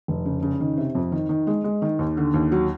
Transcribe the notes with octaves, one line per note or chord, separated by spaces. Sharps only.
F1
C#3
C#3
D#3
C3
F2
D#3
D#3
G#3
G#3
D#3
D#2
D3
D#2
F#3